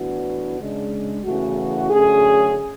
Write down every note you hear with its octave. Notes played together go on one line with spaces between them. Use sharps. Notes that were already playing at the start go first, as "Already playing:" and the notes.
Already playing: A2 E3 B3 D4 F#4
C#3 G#3 D4
E2 C#3 E3 A3 F#4
F#2 D3 A3 C#4 G#4